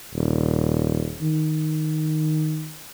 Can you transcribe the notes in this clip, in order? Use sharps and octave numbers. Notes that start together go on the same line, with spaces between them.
D#1
D#3